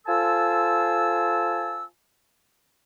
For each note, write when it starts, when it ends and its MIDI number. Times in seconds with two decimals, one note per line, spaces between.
0.06 1.84 65
0.06 1.84 69
0.06 1.84 72
0.06 1.84 80
0.06 1.84 81
0.06 1.84 88